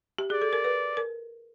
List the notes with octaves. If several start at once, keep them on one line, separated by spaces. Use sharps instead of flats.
G4
G#4 D5
A4
A#4
B4
A#4